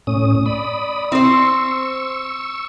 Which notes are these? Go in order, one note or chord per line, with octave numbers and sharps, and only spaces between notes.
A2 C#4 D#6
D5 B5 D#6
C4 E4 C5
C#6 E6